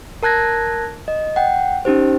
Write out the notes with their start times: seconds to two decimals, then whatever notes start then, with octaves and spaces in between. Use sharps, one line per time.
0.23 A#4 A5 F#6 G#6 A#6
1.08 D#5
1.36 F#5 G5
1.85 C#4 D#4 G4 C5